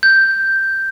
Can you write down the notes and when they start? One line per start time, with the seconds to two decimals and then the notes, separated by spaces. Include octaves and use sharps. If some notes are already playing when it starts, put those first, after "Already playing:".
0.03 G6